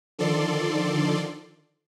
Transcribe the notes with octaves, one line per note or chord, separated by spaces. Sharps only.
D3 D#3 F3 A4 D5 C6